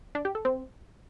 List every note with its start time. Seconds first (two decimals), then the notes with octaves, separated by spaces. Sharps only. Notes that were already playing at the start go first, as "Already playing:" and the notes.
0.15 D4
0.25 G4
0.35 A4
0.45 C4